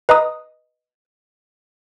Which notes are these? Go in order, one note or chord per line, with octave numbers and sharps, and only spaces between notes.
B4 D#5 A#5 D#6